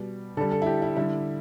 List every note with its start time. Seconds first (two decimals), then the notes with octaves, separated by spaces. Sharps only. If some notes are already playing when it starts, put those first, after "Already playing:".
Already playing: B2 G3
0.37 D3 G3 A4
0.51 A4
0.62 E4
0.67 G4
0.82 E4
0.97 D3 G3 E4